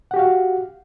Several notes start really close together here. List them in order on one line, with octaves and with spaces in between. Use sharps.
F#5 G4 F#4 F5